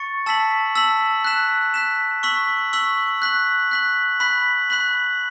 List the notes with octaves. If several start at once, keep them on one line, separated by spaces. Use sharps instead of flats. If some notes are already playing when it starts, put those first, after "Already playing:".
Already playing: C#6 A6 C#7
A5 E6 B6 F#7
A5 E6 B6 F#7
F#6 B6 E7
F#6 B6 E7
C#6 E6 B6 F#7
C#6 E6 B6 F#7
F#6 B6 F#7
F#6 B6 F#7
B5 F#6 B6 F#7
B5 F#6 B6 F#7